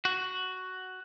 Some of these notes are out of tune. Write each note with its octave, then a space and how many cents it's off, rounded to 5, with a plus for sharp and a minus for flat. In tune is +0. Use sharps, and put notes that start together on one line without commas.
F#4 +5